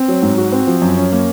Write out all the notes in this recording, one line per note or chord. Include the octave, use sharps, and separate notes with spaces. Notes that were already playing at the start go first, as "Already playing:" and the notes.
Already playing: C4
F#3
G#2
F#4
C4
F3
F#2
C#4
A#3